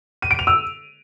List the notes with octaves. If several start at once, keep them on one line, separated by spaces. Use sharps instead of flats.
D#7
D7
F7
E6